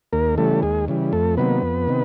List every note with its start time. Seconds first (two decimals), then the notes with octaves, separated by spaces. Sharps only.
0.13 D#2 A#3 A#4
0.38 C#3 E3 G3 A3 A4
0.63 D#2 G#3 G#4
0.88 C#3 E3 G3
1.13 F2 A3 A4
1.37 C3 D#3 F#3 A#3 B3 B4
1.62 F2
1.88 C3 D#3